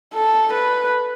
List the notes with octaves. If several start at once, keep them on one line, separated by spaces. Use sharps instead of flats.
A4
B4